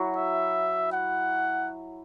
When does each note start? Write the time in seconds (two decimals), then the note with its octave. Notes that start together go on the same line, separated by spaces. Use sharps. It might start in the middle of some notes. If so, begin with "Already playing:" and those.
Already playing: F#3 E4 F#4
0.16 E5
0.92 F#5